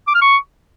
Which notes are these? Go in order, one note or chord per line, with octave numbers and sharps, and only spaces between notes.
D6
F6
C#6